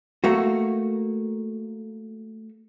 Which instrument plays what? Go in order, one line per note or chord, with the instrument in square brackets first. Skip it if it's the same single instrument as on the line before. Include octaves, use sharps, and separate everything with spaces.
[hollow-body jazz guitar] A3 A#3 F#4